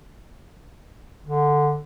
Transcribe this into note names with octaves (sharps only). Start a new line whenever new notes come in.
D3